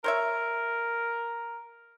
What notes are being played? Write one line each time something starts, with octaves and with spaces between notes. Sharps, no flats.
A#4 C5 C#5 E5